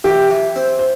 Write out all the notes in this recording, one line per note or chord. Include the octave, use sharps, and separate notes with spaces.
E3 G4
E3
C4
C5